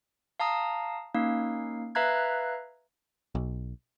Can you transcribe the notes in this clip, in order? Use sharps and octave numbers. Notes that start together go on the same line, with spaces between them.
F5 A5 A#5 D#6
A#3 C#4 D#4 F5
B4 E5 F5 A#5 F#6 G#6
B1